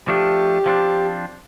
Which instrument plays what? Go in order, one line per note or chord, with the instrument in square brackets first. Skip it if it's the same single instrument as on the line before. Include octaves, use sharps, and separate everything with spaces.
[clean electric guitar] F3 A3 D4 [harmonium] G4
[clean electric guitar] F3 C4 D4